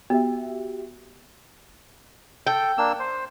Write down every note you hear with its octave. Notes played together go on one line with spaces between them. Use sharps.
B3 F#4 G4 E5
A4 G5
A#3 D4 E6
C5